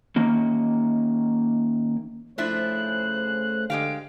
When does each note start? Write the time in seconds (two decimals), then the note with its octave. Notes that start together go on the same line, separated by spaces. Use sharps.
0.16 D#3 A#3 C#4
2.38 C#3 F3 A3 D4 E4 C5 F#6
3.70 D3 G#3 G4 F5 D7